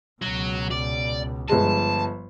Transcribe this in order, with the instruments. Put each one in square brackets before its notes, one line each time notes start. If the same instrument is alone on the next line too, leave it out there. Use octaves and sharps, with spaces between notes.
[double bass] C#2 B2 [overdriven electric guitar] F#3
[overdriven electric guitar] D5
[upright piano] G1 G#3 [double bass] G2 F3 [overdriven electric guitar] A5